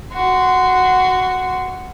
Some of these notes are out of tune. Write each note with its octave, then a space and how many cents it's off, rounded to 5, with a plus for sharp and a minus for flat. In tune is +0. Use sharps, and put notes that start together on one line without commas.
F#4 +0 C6 -20